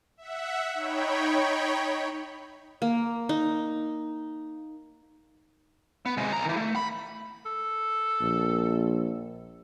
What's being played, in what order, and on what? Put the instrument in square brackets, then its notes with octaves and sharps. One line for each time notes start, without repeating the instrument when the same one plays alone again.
[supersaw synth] E5 F#5
D#4 C#5 G5 B5
[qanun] A#3
D#4
[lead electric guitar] B3
C3 G#3
B1 A#5
D#3 E3
A3
B5
[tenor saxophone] A4
[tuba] A#1